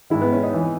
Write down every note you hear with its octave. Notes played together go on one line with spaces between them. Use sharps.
G#2 D#3 E4
B3
C#4
D#4
E3